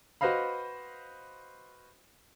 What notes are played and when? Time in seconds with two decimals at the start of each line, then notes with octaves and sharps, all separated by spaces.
0.21 F#4 B4 C5 D#5 F5 B5